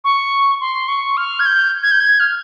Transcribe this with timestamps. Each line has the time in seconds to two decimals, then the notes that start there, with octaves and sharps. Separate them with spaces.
0.04 C#6
0.61 C6
0.88 C#6
1.17 F6
1.40 G#6
1.46 G6
1.83 G#6
1.91 G6
2.00 G#6
2.20 F6